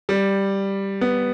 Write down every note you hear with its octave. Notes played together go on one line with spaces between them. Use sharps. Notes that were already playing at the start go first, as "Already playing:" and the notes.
G3
B3